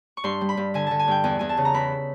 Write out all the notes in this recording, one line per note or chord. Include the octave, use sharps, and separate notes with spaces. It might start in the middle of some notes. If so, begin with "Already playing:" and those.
C#6
G2 C6
G3
B5
G2
D3 G#5
D3 A5
G#5
G2 G5
E2 G#5
E2 G#5
A5
C#3
A#5
E2 B5